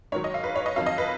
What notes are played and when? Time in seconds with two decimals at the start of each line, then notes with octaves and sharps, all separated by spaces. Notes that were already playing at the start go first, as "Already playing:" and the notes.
0.12 G#2 D#3 F#3 C#5
0.24 D#5
0.34 F5
0.44 B4
0.56 C#5
0.66 D#5
0.76 F2 D#3 F#3 F5
0.86 D#5
0.98 B4